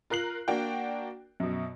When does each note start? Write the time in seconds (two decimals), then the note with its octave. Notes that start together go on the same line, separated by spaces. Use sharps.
0.10 F4 A#4 F#6 C7 F#7
0.48 A#3 D4 F#4 G5
1.40 F#2 B2